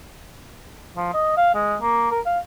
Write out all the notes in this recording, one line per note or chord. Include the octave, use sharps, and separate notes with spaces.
F3
D#5
F5
G#3
A#3
A#4
F5